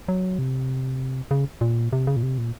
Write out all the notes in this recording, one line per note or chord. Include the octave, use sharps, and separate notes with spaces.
F#3
C3
C#3
A#2
C3
C#3
A#2
C3
A#2